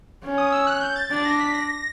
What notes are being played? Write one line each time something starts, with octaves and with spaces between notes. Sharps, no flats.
C#4
D#6
E6
F#6
G6
A6
D4 A6
A#6
B6
A#6